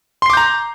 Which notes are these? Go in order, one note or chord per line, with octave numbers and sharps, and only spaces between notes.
A#5 C6 D6 G6 C7